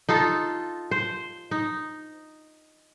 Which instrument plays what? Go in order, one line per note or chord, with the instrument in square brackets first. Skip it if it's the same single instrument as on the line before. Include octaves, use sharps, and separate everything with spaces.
[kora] D#4 F4 A4
C5
D#4